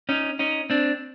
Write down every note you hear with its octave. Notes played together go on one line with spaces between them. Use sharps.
C#4 D#4
C#4 D#4
C4 D4